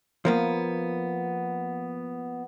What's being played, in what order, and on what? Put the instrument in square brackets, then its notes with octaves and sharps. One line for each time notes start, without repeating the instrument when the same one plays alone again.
[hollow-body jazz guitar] F3 A#3 B3